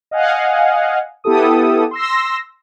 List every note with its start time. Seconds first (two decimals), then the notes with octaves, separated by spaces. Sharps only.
0.11 D#5 F5 F#5 G#5
1.24 B3 E4 G4 A4 D#6
1.91 C6 E6 A#6